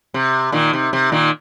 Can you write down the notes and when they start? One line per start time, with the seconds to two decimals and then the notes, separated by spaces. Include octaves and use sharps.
0.14 C3
0.52 A#2 D#3
0.73 C3
0.93 C3
1.12 A#2 D#3